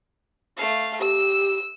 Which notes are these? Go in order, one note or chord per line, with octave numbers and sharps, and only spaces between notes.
A3 F5
G4 E6